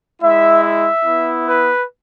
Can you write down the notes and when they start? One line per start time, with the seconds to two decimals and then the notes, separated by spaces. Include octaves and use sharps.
0.22 G#3 E4 E5
0.63 E5
1.05 B3 E4
1.47 B4